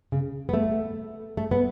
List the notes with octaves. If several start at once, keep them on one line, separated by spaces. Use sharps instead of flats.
C#3
B3
A3
A3
B3